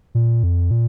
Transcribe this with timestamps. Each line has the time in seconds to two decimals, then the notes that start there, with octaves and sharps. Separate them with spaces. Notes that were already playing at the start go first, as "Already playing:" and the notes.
0.15 A#2
0.43 F2
0.71 A#2